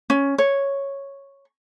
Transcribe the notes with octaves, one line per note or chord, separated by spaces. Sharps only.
C#4
C#5